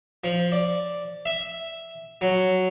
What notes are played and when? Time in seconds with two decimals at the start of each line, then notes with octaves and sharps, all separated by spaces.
0.24 F3
0.52 D5
1.26 E5
2.21 F#3